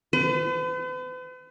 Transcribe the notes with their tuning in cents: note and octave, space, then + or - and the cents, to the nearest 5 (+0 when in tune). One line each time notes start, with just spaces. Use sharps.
B4 +45